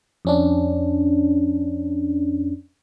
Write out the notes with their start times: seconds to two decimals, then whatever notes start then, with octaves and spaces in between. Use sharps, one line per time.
0.25 F2 C#4 D4